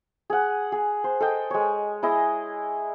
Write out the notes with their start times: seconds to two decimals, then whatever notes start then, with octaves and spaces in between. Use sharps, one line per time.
0.30 G#4 F#5
0.72 G#4
1.04 C5
1.20 A4 D#5 G5
1.51 G#3 C#5
2.03 E4 G#4 D#5